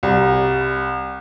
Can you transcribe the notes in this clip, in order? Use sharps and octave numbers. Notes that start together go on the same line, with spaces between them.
C2